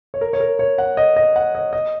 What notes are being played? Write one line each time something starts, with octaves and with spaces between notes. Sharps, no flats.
C#5
A#4
C#5
A#4
C#5
F#5
D#5
D#5
F#5
D#5
D#5